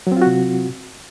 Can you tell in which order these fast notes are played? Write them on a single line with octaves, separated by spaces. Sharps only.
F#3 C4 F4 F#4 C3